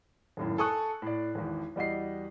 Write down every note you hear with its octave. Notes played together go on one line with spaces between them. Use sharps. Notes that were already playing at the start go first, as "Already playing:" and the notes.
G#1 F#2 A2
A4 G#5 C#6 D#6 F#6
A2 D5
G#1 E2
E2 G3 F#4 D#5 C7